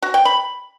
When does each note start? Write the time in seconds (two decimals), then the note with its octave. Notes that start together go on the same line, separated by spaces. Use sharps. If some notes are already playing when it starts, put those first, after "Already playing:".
0.02 F#4
0.14 G5
0.25 B5